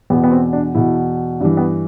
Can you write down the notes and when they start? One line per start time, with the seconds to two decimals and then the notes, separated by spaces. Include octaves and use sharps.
0.10 E2 B2 B3
0.24 B3
0.31 C4
0.53 D4
0.75 E2 B2 E4
1.40 G2 E3 D4
1.57 B3